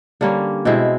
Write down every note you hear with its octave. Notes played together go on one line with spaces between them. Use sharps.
D3 G3 A#3 C#4
B2 G#3 C4 E4